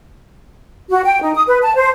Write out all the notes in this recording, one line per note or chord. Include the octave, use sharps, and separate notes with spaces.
F#4
G5
D#4
D#6
B4
A5
C5